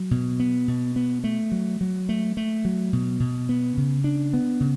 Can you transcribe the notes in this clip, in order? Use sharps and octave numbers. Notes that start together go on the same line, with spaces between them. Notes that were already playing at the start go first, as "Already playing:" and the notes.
Already playing: F#3
B2
B3
B2
B3
A3
F#3
F#3
A3
A3
F#3
B2
B2
B3
C#3
D4
B3
C#3